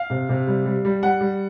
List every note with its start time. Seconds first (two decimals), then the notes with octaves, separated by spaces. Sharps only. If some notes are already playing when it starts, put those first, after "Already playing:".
Already playing: F5
0.10 C3
0.29 C3
0.47 G3
0.66 G3
0.85 G3
1.03 G3 F#5
1.21 G3